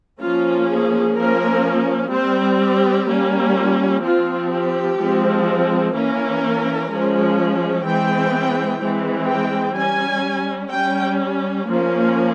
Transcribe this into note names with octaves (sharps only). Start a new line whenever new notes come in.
F3 A#3 C#4 F4
G#4
F3 A#3 C#4 A#4
G3 C4 C5
G4
G3 A#3 C#4
F4
F3 C4 F4
G4
F3 G#3 C4
E3 A#3 C#4 A#4
F3 G#3 C#4
E3 G#3 C4 G5
E3 G#3 C4
G5
G3 C#4 G#5
G3 C#4 G5
F3 A#3 C#4